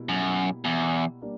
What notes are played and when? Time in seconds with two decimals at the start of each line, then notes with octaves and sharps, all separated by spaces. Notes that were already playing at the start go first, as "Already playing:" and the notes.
Already playing: B2 G3 A#3 E4
0.09 F#2
0.65 E2
1.22 G3 A#3 D4